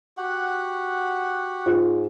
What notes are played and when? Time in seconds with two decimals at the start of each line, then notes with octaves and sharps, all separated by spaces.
0.17 F#4 G4 F#5
1.66 G#2 F4